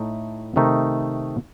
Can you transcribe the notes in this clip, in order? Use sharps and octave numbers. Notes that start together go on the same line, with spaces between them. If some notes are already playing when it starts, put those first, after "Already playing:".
Already playing: A2 A3 D#4
C3 D#3 A3 D#4